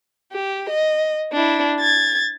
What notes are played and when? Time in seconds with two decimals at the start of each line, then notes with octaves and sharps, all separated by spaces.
0.32 G4
0.70 D#5
1.33 D4 E4
1.80 G#6 A6